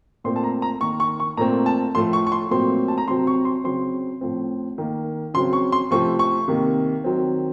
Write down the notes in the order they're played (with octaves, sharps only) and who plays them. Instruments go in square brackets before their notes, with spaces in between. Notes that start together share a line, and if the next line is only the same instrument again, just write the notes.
[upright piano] A#2 A3 C4 C6
A5
A#5
A#5
D#3 A#3 C#6
C#6
C#6
A#2 A3 C4 A#5
A5
A2 F3 A3 C6
C#6
C#6
C6
A#2 F#3 A3 C4 C6
A5
A#5
C3 F#3 C4 C6
C#6
C6
C#3 F#3 C4 C6
A2 F3 C4
D#3 A#3
C#3 F#3 C4 C6
C#6
C6
C3 F3 A3 C4 C#6
C#6
C3 D#3 A#3
D#3 F#3 C4